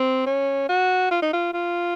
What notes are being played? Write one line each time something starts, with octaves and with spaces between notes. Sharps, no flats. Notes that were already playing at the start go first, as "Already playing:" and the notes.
Already playing: C4
C#4
F#4
F4
D#4
F4
F4